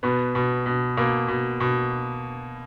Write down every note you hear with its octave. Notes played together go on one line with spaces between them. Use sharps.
B2 B3
B2
B2
B2 A#3
B2
B2